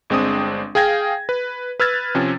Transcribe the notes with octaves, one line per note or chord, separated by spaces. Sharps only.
G1 G#3 C4 D4 D#6
G#4 F5 G5 G#6 A#6
B4
B4 E6 F6 G#6 A6
C3 F3 C4 C#4